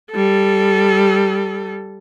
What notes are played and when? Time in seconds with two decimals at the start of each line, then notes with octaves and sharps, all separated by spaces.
0.12 G3 A4